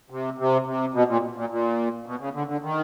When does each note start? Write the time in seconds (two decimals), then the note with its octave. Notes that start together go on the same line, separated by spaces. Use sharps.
0.10 C3
0.38 C3
0.66 C3
0.94 B2
1.08 A#2
1.36 A#2
1.50 A#2
2.06 B2
2.19 C#3
2.34 D3
2.47 D3
2.62 D#3